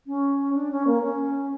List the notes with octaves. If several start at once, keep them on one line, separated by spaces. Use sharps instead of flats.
C#4
D4
C#4
A#3
C#4